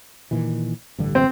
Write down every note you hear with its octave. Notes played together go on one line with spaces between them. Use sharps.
A#2 D#3 E3
A1 G2 D3
C4